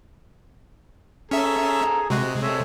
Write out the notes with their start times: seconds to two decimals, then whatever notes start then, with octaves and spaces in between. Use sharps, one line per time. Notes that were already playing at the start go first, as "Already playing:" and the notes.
1.31 C#4 G#4 A4 E5 A#5
2.10 C3 G#3 F#4
2.42 A4 C#5 E5